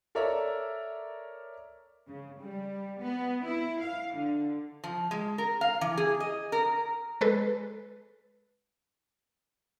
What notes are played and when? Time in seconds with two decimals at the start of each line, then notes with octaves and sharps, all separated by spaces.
0.15 A4 A#4 C#5 D5 E5 A#5
2.08 C#3
2.40 G3
3.00 B3
3.44 E4
3.82 F5
4.15 D3
4.84 F3
5.11 G#3
5.38 A#4
5.61 F5
5.81 E3
5.97 G#4
6.20 D#5
6.52 A#4
7.21 G#3 A4 B4